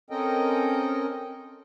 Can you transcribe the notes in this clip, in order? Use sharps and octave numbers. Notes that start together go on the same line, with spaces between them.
C4 C#4 A4 A#4 D#5 G5